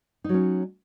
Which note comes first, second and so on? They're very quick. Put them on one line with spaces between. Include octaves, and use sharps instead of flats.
D#4 F#3 C#4